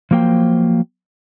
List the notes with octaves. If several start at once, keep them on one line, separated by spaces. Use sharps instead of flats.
F3 F#3 A#3 C5 G5